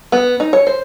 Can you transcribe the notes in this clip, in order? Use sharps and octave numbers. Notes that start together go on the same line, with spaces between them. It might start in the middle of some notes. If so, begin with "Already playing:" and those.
B3
D#4
C#5
C5